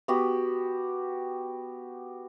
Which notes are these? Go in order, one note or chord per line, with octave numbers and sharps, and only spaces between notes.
B3 F#4 G4